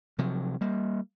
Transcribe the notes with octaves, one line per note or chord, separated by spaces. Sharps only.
C3 F3 F#3
G3 A#3